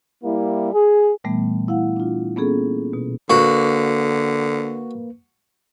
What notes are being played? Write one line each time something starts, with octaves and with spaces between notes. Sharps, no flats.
G3 A#3 E4
G#4
A#2 E3 G3 A3 B3
E4 F5 F#5
D4 F4
A#3 B3 C#4 G#4 A4
B2
D3 A#3 F#4 B4